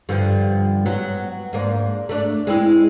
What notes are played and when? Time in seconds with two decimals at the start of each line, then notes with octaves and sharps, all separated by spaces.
0.09 G2 D3 F3
0.86 F#3 B3
1.53 G#2 A#3 D4
2.09 A3 D4
2.47 G#3 C4 E4